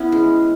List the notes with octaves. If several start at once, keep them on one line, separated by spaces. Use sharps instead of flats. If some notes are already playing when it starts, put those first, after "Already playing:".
Already playing: B3 C#4 E4
G#3